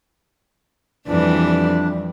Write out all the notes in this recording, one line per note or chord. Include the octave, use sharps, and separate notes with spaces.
F2 E3 G3 D4 B4 D5